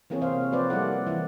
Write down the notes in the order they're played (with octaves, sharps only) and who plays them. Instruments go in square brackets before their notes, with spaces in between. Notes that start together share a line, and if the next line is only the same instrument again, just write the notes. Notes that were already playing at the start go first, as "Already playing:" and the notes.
[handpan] E3 A#3 C4 G#4 C#5
C3 C5 F5
F3 A#3 B4 C5 D5
G3 A#3 E4 A4 F#5
E3